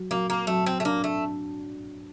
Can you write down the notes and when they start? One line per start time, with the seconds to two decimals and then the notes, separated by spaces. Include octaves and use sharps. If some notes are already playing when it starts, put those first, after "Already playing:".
Already playing: F#3
0.11 F#3 A#3
0.30 A#3
0.47 F#3 A3
0.66 C4
0.80 A3
0.85 A#3 D4
1.04 A3